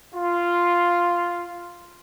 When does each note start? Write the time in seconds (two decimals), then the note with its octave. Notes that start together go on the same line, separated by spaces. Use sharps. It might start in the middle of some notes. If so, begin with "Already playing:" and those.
0.15 F4